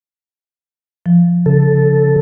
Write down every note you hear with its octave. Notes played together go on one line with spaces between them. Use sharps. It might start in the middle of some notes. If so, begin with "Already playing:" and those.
F3
C#3 A4